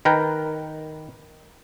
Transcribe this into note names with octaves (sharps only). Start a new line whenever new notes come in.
D#3 A#4 B4 G5